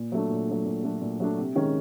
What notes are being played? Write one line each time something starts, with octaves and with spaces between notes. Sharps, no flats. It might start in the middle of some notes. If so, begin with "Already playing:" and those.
Already playing: A#2
F#3 A3 D4
A#2
F#3 A3 D4
A#2
F#3 A3 D4
A#2
F#3 A3 D4
C3
D#3 G#3 C#4